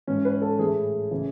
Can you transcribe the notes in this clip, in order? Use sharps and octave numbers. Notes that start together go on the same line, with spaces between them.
G#2 E3 C#4
B4
A4
A2 E3 G#4
C#3 E3